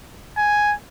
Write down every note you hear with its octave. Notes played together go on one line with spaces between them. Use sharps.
G#5